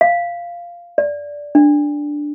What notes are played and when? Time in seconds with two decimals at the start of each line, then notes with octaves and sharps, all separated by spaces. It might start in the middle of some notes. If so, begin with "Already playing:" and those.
0.01 F5
0.98 D5
1.55 D4